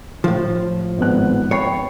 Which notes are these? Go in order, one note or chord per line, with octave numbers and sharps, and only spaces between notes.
A2 F3
G#1 B3 F#6
C#5 G5 B5 C7